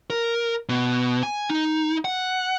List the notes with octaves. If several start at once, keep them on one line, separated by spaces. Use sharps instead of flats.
A#4
B2
G#5
D#4
F#5